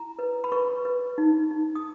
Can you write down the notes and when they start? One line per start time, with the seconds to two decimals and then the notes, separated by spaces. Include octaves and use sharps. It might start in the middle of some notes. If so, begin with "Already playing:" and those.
Already playing: E4 A#5
0.19 B4
0.44 B5
0.52 B4 C#6
0.85 B4
1.18 D#4
1.51 D#4
1.75 D#6